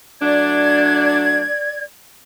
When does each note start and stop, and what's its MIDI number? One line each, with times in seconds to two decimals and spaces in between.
0.21 1.45 54
0.21 1.45 57
0.21 1.45 62
0.21 1.83 74
0.21 1.83 92